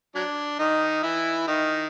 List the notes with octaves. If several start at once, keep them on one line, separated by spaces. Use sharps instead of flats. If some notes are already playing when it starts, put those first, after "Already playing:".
F#3 D4
D#3 D#4
E3 E4
D#3 D#4